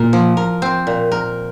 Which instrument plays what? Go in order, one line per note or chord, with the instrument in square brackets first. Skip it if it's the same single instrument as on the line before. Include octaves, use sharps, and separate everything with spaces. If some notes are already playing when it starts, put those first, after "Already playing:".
Already playing: [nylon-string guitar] A#2 [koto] A#4
[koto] F3
A#4
C4
A#2
A#4